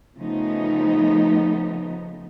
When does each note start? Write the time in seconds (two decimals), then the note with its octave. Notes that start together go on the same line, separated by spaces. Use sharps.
0.18 C#3 F3 A3 B3 D#4